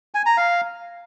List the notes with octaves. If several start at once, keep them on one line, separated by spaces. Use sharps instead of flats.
G#5
A#5
F5